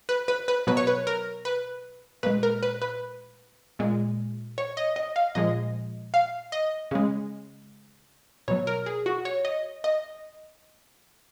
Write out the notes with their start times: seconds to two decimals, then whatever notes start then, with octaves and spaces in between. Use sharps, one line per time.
0.09 B4
0.28 B4
0.48 B4
0.67 B2 F#3 B4
0.77 C#5
0.87 B4
1.07 A#4
1.45 B4
2.23 A#2 G#3 B4
2.43 A#4
2.63 B4
2.82 B4
3.79 A#2 G#3
4.58 C#5
4.77 D#5
4.96 D#5
5.16 F5
5.35 A#2 F3 G#3 D#5
6.14 F5
6.52 D#5
6.91 C#3 G#3
8.48 B2 F#3 C#5
8.67 A#4
8.86 G#4
9.06 F#4
9.25 C#5
9.45 D#5
9.84 D#5